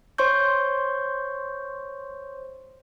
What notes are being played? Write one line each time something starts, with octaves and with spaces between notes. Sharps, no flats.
C5 C#5 C6 C#6 G6